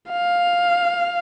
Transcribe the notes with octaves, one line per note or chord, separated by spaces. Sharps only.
F5